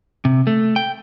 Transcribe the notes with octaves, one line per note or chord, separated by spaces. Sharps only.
C3
A3
G5